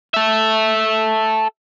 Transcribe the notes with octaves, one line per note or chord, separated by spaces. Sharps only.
A4 E5